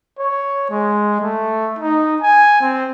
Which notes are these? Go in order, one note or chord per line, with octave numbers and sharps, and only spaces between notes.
C#5
G#3
A3
D#4
G#5
C4